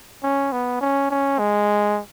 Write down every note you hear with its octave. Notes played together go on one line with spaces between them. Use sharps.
C#4
B3
C#4
C#4
G#3